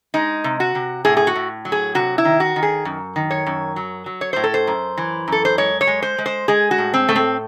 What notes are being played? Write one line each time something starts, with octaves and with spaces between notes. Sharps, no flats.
G#3 D#4
C3
F#4
C3
A2 G#4
G#4
F#4
A2
F#3
G#4
C3 F#4
E4
D#3
F#4
D#3
G#4
F#2
D#3
C#5
F#2
F#3
F#3
C#5
A2 C5
A4
C5
F#2
E3
F#2 A4
C5
G#3 C#5
C#5
G#3
C5
G#3
C5
G#3 G#4
F#4
A2
C4
A2 A3
C4